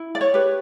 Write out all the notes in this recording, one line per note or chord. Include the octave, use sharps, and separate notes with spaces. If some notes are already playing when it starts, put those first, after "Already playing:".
Already playing: E4
D5
C#5
G4 B4